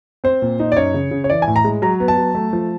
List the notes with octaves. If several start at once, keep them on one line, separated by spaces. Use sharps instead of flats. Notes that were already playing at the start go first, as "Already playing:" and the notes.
C4 C5
A#2
D#4
D5
F#2 C#5
C#3
C#3
C#5
E3 D5
G#5
A2
A#5
G#3
F#3 A#5
B3
A5
F#3
A3
F3